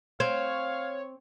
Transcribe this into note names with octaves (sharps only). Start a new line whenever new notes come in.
C4 C#5 F5